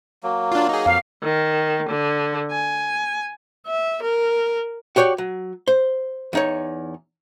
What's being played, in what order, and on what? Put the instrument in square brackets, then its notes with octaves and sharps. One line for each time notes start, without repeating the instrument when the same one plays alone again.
[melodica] F#3 A#3
[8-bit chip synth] D4 F4
D#4 G#4
[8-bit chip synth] F2 [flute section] F5
[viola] D#3
D3
G#5
E5
A#4
[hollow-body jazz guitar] F#4 G4 C#5 D5 G5
F#3
C5
E2 D#4 C#5